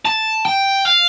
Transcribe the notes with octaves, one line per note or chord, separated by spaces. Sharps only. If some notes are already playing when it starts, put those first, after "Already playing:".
A5
G5
F5